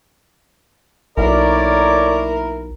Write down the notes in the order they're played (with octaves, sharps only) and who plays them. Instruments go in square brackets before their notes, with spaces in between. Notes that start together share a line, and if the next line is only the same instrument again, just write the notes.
[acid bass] B1 [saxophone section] A#3 E4 A#4 [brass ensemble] A4 C#5 D5